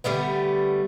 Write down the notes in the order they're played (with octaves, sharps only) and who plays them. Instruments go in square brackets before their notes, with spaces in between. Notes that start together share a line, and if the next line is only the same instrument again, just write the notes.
[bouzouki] D3 G3 A3 B3